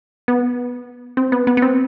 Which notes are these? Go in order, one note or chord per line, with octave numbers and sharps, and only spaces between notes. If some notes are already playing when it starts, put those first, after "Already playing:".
B3
C4
B3
B3
B3
C4